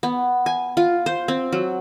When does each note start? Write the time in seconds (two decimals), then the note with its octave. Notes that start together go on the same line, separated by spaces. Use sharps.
0.03 B3
0.46 G#5
0.77 F4
1.06 C5
1.28 C4
1.52 F#3